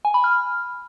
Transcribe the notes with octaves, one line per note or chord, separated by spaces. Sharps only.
G#5
B5
F6